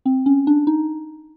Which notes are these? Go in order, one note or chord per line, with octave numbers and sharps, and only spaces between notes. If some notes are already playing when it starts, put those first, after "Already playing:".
C4
C#4
D4
D#4